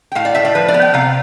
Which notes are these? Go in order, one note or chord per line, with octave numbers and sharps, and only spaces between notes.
G5
A2 F5
D5
A2 E5
D5
F3 B4
D5
B3
G5
C3 F5